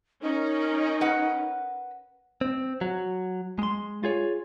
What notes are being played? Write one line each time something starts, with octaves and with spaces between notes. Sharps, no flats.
C#4 D#4 A#4
B4 F#5
C4
F#3
G#3 C6
F4 G#4 C#5